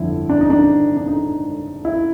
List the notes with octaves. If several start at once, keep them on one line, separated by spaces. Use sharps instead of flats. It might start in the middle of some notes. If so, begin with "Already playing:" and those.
Already playing: G1 F2 D3 F3 E4
D4
D#4
D4
D4
D#4
E4